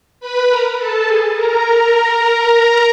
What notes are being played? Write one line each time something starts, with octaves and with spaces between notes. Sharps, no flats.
B4 B5
A#4 A#5
A4 A5
G#4 G#5
A#4 A#5
A#4 A#5